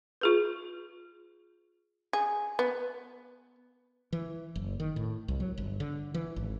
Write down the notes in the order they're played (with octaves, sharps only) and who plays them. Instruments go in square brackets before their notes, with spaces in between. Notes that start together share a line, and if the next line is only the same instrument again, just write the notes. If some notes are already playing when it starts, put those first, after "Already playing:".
[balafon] F4 G#4 B4
[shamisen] G#4
B3
[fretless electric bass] E3
F#1
D#3
A2
C2
F#3
G1
D3
E3
G#1